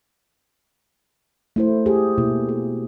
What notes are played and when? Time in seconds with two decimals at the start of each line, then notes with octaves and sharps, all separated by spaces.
1.56 A3 E4 C5
1.86 G4 G#4
2.18 B2 A#3 E4
2.49 G#4